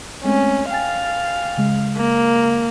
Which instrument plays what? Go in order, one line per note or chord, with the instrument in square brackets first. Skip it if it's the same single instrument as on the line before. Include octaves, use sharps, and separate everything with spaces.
[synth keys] G#3 A3 C4 [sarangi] C#4
[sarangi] F5 [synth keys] G5 G#5 A6
[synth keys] C#3 G#3
[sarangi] A#3